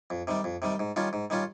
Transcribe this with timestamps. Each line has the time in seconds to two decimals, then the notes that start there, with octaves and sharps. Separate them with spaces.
0.10 F2
0.27 C3 D#3 G3
0.44 F2
0.62 C3 D#3 G3
0.80 G#2
0.96 D#3 G3 C#4 F4
1.13 G#2
1.30 D#3 G3 C#4 F4